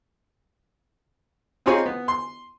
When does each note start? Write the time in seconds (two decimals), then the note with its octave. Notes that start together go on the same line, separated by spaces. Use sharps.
1.66 C4 D#4 F4 G#4 C#5 G#5
1.86 B3
2.08 C6